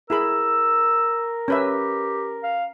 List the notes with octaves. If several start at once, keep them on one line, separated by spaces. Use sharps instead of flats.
E4 G#4 A#4 B5 E6
C#4 G4 B4 E5
F5